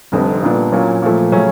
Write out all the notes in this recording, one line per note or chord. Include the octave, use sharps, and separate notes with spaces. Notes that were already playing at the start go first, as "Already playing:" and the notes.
F1 F2 D3 G3
A#2 G3 B3 D4
A#2 F#3 A#3 C#4 F4
A#2 F3 A3
C#3 F#3 A3 C#4